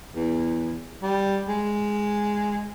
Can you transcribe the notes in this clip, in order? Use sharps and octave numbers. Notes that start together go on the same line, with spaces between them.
E2
G3
G#3